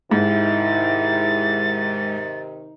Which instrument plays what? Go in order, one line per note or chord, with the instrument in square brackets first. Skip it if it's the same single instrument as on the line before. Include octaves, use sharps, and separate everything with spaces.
[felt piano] G#2 [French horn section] C3 D#3 D#4 [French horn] E4 [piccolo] A6